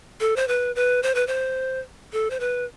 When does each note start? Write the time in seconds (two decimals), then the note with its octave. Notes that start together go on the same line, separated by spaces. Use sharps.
0.20 A4
0.36 C5
0.48 B4
0.75 B4
1.03 C5
1.15 B4
1.27 C5
2.12 A4
2.30 C5
2.40 B4